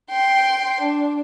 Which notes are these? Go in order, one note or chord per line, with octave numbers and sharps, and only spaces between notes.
G5 C6
D4